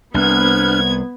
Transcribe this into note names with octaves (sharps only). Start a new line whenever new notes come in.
C2 B3 D4 F6 F#6 G#6